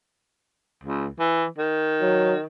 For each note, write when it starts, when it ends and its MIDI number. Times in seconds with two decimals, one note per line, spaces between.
0.84 1.07 37
1.19 1.46 52
1.58 2.44 51
2.02 2.34 54